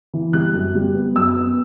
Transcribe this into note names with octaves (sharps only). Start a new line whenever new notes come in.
E3
G3 F#6
F#2
G3
B3
F#2 E6
B3